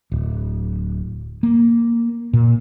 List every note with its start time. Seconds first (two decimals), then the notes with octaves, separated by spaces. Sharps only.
0.12 D1
1.43 A#3
2.33 A#2